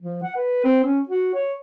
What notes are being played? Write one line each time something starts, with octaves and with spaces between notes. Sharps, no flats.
F3
F#5
B4
C4
C#4
F#4
C#5